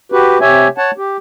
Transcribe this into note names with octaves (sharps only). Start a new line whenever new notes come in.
F#4 G4 B4
C3 G4 C#5 E5 G#5
C#5 F#5 A5
G4